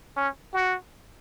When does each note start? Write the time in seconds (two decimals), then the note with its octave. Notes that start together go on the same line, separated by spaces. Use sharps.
0.17 C#4
0.54 F#4